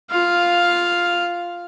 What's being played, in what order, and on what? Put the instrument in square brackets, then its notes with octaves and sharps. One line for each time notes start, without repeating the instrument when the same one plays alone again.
[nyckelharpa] F4 F5